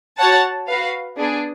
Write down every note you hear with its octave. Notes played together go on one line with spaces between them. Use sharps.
F#4 C#5 F#5 A5
F#4 B4 F5
B3 D4 G#4